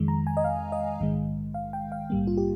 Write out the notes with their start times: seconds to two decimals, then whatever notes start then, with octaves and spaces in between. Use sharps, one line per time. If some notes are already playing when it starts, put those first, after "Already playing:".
Already playing: F2 D#3 G#3
0.08 A#5
0.27 G#5
0.37 D#5
0.44 F5
0.72 D#5
0.99 A#1 G#2 D#3 G#3
1.54 F5
1.73 G5
1.92 F5
2.10 A#1 G#2 G3 A#3
2.27 F4
2.37 G4